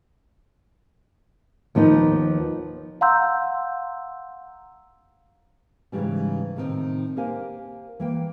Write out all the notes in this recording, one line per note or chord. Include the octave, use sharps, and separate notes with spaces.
D#2 F3 B3 D#4
F5 F#5 A#5 C6 E6 G6
G#2 C#3 E3 G3 C#4
A2 C3 D#3 A#3 C4 D#4
A#3 G4 A#4 C5 F5 G#5
E3 A#3 G5